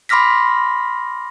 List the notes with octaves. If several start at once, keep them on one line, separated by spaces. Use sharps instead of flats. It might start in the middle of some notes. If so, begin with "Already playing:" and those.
B5 C6 D6 F6 A#6 B6